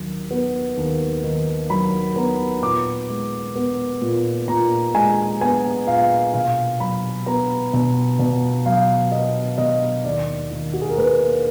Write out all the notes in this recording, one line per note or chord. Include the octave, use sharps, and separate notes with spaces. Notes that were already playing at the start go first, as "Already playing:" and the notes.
Already playing: D#2 D#3 F#3
B3
D#2
D#3
F#3 B5
B3 A#5
A#2 D6
G#3
B3
A#2
A#2 A#5
G#3 G#5
B3 G#5
A#2 F5
B2 F5
F#3 B5
B3 A#5
B2
B2
F#3 F5
B3 D#5
B2 D#5
D#2 D5
D#3
F#4
G#4
A#4
A#3 B4